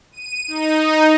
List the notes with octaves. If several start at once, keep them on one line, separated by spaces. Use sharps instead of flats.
D#7
D#4